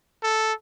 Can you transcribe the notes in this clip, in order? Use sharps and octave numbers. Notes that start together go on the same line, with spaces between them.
A4